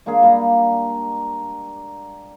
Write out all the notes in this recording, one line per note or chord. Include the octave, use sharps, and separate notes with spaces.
G#3 A#3 D4 G#4
G3 F5 A#5